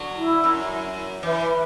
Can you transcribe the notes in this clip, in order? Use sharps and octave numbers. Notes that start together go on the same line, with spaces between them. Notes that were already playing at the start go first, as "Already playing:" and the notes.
Already playing: D3 F#3
E4
F#2
E3 B4 E5